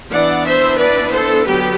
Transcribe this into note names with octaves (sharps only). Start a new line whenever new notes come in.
E3 B3 D4 D5 F#5
C5 E5
B4 D5
A4 C5
D3 F#3 B3 G4 B4